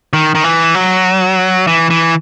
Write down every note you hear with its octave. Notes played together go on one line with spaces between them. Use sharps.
D#3
D#3
E3
F#3
E3
E3